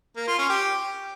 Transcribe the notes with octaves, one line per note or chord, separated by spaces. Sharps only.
A#3
F4
C#4
G4